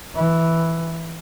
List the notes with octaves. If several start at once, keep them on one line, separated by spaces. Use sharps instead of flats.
E3